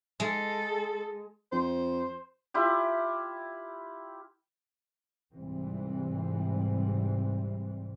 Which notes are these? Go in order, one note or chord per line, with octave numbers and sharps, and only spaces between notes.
G#3 A4
F2 C5
E4 F4 G4
C2 G#2 E3 G3 C4